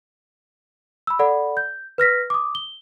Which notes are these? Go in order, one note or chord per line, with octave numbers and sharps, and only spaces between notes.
B5 E6
A4 D5 F#5 B5
G6
B4 F6 A#6 B6
D6 D#6
G7